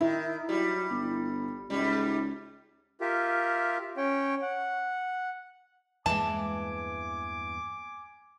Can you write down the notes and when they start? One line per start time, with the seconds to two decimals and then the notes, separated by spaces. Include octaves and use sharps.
0.01 D#3 E4
0.49 F#3 G3
0.90 G1
1.70 C#2 G#2 G3
3.01 F4 G4 A#4 E5
3.97 C#4 C#5 G5
4.42 F#5
6.06 E2 G2 E3 G#3 A#3 G#5 A5 D6